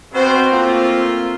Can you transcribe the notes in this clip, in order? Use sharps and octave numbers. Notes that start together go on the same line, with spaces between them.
B2 C4 F#4 C5
A3 A#3 F4